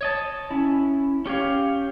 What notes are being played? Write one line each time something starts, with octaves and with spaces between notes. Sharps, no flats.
C#5 D#5 A5
C#4 E4
C#4 G4 C#5 F5